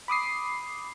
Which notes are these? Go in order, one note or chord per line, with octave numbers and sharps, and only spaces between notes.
B5 D6 D#6 C7